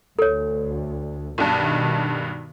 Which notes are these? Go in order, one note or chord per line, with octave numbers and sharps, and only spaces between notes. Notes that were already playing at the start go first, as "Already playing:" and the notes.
D2 A4 C#5
B1 G2 B2 D#3